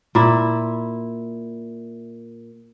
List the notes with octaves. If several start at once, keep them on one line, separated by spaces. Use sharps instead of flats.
A#2 E4